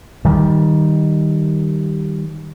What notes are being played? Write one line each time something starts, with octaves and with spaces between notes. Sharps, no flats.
D#3 G3